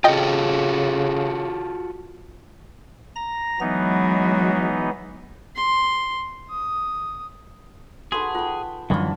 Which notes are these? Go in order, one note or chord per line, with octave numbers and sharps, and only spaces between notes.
C#3 F4 F#4 A4 D#5 G5
A#5 A#6
E3 F#3 G#3 B3 D#4
C6
D#6
D#4 F#4 G#4 A4 B4 A5 C6
F4 F#5 G5
F#2 D3 E3 G3 G#3 F4 A5 C#6